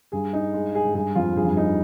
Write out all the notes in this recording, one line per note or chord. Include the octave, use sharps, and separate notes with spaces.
G2 G#4
D#4
G#3
G#4
G#2
G2 G#4
F2 F4
G2 G#4
F2
G2 D#4